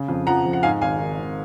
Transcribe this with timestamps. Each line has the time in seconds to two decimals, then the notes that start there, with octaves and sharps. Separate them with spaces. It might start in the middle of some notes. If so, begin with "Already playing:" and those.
Already playing: C#3
0.08 F2
0.27 F3 F#5 A#5
0.45 F2
0.53 F#5
0.63 G#2 F5 G#5
0.81 G#1 F5 G#5
0.99 D#3
1.18 G#1